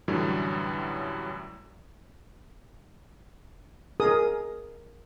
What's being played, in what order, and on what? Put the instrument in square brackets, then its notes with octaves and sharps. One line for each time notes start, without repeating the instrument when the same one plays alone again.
[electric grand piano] F#2 A2 D3 E3 F#3 G3
[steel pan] G#4 A#4 D#6